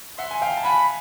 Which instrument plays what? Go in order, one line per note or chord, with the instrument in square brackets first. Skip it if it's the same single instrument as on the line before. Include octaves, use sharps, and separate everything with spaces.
[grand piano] E5 F#5 [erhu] C6
[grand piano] G#5
F5 G5
A5
[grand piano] F#5 G#5 [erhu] B5